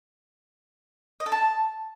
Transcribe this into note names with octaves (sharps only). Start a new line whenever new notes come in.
D#5
A4
A5